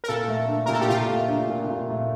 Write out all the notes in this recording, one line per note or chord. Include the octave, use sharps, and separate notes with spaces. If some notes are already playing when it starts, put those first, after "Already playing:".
A#4
A#2 A4
A3
D4
A#2 A#4
A4
G4
A#2 F4
A3
D4
A#2
A#2
A3